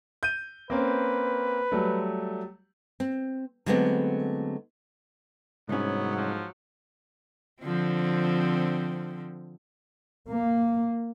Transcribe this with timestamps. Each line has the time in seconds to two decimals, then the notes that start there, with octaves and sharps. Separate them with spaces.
0.23 G6 D#7
0.70 A#3 C4 C#4 B4
1.72 F#3 G3 A3
3.00 C4
3.66 D3 F#3 G#3 A3 B3 C4
5.69 C2 G#2 F#3 B3 C#4
6.16 F3
7.62 D3 F3 C4
10.27 A#3